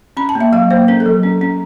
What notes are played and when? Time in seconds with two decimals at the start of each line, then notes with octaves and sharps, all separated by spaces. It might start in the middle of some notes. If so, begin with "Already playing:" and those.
0.17 C#4 B5
0.29 A5
0.35 A#3
0.40 E5
0.53 F#3 F5
0.71 A#3 C5
0.88 C#4 A#4
1.00 A4
1.06 F#3
1.23 C#4
1.41 C#4